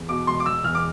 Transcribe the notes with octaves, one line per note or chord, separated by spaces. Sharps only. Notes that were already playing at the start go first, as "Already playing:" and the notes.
Already playing: E2
B2 D6
E1 C6
D6
E1 E6
E2 F6
D6